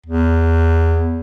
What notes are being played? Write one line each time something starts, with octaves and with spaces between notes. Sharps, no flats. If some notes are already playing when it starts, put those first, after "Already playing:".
E2